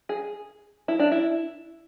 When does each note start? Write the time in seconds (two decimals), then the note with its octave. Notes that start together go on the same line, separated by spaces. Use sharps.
0.09 G#4
0.88 E4
0.99 D4
1.12 E4